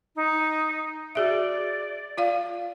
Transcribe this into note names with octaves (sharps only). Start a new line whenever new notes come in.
D#4
F#4 G#4 D5 E5
F4 D5 F5